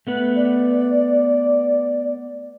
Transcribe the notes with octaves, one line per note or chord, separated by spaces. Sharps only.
A3 B3 B4
D5